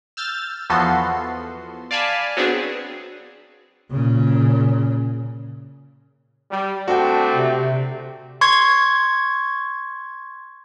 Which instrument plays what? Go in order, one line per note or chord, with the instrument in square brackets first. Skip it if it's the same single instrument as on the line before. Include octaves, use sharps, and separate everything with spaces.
[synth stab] E6 F6 G6 A6
E2 F3 B3 F#4 A4 C6
D5 F5 G#5 A5 B5
F#3 B3 C4 D4 G#4
[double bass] A#2 C#3
[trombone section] G3
[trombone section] A3 C4 D4 [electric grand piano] F#4 G5
[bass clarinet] C3
[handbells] C6 C#6 G#6